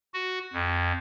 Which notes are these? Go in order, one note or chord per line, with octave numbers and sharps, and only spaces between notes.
F#4
F2